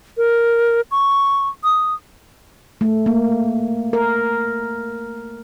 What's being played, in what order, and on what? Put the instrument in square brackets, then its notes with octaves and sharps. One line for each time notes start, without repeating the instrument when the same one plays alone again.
[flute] A#4
C#6
D#6
[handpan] A3
A#3
A#4